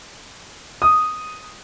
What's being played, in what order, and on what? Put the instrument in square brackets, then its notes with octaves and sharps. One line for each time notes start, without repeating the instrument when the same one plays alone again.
[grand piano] D#6